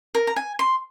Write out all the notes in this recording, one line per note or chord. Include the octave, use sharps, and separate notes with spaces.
A#4
A#5
G#5
C6